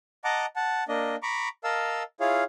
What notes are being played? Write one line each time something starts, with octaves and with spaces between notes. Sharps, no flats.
D#5 F#5 A5 A#5 D6
F#5 A5
A#3 D4 D#5
A#5 B5 C#6 D6
A#4 D#5 F5 A5 E6
E4 F4 G#4 C#5 F5